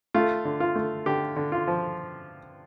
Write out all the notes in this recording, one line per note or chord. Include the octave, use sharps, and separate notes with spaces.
A3 F4
D3
F4
A3
D3 G4
D3
F4
F3